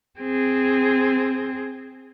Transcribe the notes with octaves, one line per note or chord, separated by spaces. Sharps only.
C4 G#4